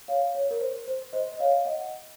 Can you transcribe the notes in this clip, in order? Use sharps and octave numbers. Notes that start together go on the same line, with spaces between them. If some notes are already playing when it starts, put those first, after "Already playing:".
C#5 F5
C#5
A#4
C5
C5
C5 D#5
D#5
C#5 F5
D#5 F#5